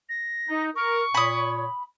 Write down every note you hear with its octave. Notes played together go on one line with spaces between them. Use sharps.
A#6
D#4
A#4 C#6
A#2 C#5 B5 D#6